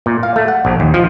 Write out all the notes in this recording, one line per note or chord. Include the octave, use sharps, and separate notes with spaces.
A#2
F5
A3
F#5
A#1
D#2
F3